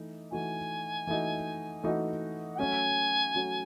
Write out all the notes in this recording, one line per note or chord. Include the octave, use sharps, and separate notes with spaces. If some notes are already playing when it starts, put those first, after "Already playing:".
Already playing: E3 A3 D#4
E3 A3 D#4 F#4 G#5
E3 A3 D#4 F#4
E3 A3 D#4 F#4
F#5
F#3 A3 C#4 F#4 G#5
F#3 A3 C#4 F#4